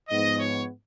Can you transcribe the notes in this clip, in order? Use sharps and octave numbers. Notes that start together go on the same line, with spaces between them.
G#2 F3 B3 D#5
C#5